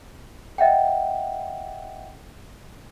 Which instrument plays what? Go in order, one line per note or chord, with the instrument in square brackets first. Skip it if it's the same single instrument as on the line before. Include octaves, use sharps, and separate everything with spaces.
[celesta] D#5 E5 F#5 G5